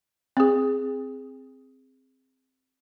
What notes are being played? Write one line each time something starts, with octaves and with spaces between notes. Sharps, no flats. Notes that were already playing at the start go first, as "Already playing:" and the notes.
C4 G#4